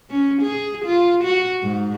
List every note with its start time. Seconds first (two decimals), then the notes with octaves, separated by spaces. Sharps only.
0.10 C#4
0.42 G#4
0.85 F4
1.24 F#4
1.63 G#2